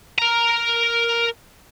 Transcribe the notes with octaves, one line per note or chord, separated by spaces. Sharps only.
A#4 A#5